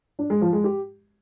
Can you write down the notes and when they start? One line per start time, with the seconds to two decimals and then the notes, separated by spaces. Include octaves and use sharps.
0.19 D4
0.30 G#3
0.41 F3
0.53 G#3
0.64 G4